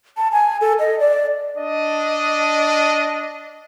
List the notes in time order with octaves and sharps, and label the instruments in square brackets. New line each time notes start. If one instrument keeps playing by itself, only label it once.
[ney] A5
G#5
A4
D#5
D5
[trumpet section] D4 D#5